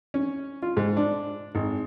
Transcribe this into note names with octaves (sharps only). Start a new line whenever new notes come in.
C#4
F4
G#2
D4
G#1